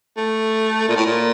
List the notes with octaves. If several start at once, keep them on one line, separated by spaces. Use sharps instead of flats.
A3
A#2
A2
A#2